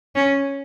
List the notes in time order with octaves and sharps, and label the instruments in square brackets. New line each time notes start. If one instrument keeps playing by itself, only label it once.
[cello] C#4